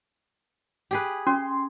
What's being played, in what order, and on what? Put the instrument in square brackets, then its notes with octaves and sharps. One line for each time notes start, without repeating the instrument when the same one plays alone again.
[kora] G4 G#4 B4
[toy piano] C#4 [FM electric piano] C6